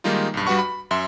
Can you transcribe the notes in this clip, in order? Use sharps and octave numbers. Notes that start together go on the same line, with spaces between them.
D#3 G3 G#3 A#3 D#4 F4
B1 G2
G2 G3 F#4 B4 F#5 C#6
B5
F#2 E5 C6